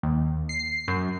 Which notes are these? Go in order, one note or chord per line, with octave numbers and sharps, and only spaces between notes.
D#2
C7
F#2